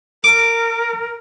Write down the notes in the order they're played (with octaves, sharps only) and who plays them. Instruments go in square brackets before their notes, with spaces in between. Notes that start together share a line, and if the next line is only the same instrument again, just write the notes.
[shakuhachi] A#4 [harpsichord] D6